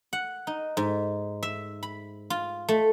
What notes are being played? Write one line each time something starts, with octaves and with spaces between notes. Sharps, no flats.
F#5
D#4
G#2
E5
B5
F4
A3